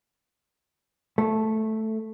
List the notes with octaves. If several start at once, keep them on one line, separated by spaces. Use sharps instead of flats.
A3